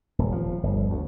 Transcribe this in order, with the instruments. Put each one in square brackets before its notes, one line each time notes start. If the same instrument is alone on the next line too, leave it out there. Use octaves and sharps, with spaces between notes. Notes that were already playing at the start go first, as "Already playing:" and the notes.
[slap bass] D#1
F3
G1
D2